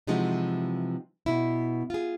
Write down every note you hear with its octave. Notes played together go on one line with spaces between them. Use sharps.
C3 E3 F3 G#3 D#4 F#4
B2 E4
F4 G#4